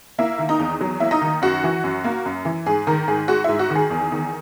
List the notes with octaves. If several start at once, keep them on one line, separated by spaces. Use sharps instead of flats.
A#3 E4
D#3
D#4
E2
F#3
A#3 E4
D#4
D#3
F#2 F#4
E3
F#2
A#3
F#2
E3
G#2 G#4
D#3 A#4
G#2 G#4
G#3 F#4
G#2 E4
F#4
D#3
G#4
E2
D#3